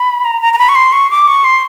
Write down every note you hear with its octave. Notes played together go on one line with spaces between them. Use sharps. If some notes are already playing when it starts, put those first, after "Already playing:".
Already playing: B5
A#5
A#5
A#5
B5
C#6
C6
C#6
D6
C#6
C6